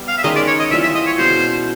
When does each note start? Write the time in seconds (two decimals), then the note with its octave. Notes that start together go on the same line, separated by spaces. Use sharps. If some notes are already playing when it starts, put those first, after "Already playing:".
Already playing: G3 B3
0.08 F5
0.18 E5
0.23 D#3 G#3 C#4 D#5
0.36 D5
0.48 C#5
0.59 D#5
0.71 E3 G3 C4 F4 E5
0.83 E5
0.95 D#5
1.07 C#5
1.18 B2 G#3 C#4 C5